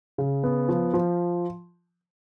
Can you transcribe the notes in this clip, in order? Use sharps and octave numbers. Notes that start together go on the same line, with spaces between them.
C#3
B3
F3
F3